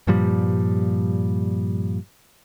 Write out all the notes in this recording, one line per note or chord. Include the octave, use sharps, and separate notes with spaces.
G2 A#2 F3 G3